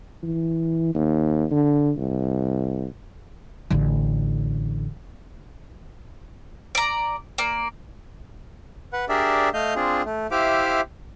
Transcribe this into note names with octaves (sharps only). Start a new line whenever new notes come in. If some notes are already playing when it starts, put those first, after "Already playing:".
E3
D#2
D3
C2
A1 D3
D5 A#5
A#3 D5
B4 F#5
D4 G4 G#4 A#4 D5 E5
A3 D#5 F5 G6
C4 D4 F4 G#4
A3
E4 G4 C5 E5 F5 D6